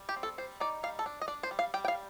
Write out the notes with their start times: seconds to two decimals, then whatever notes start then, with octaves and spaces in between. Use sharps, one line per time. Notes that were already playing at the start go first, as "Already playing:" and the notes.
Already playing: G3
0.09 G4
0.16 C4
0.23 A4
0.38 G3 C5
0.60 D#4 D5
0.83 G3 F5
0.99 A4
1.06 D4
1.21 D#5
1.28 D4 D5
1.43 C5
1.51 G3
1.59 F5
1.74 G3 G5
1.85 G5
1.88 F5